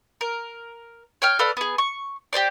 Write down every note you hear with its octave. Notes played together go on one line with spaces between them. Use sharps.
A#4
C#5 G5 F6
A4 B4 D5 F5
B3 G#4
C#6
G4 G#4 C5 D5